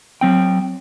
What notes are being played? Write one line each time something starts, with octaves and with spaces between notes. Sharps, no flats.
F#3 C4 G5